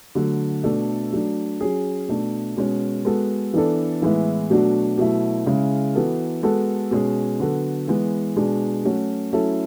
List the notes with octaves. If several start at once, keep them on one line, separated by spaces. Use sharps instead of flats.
D3 F#3 A3
B2 A3 D4 A4
F#3 A3 D4
F#3 C#4 G#4
B2 A3 D4
B2 G#3 C#4
G#3 B3 F#4 A4
E3 B3 D4 A4
A2 E3 G#3 B3 E4
B2 F#3 A3 D4 F#4
B2 F#3 A3 E4
C#3 G#3 C#4 E4
E3 B3 F#4 A4
G#3 B3 F#4 A4
B2 G#3 C#4 G#4
D3 F#3 B3 F#4 A4
E3 G#3 B3
B2 G#3 D4 G#4
F#3 A3 C#4 F#4
F#3 A3 C#4 E4 A4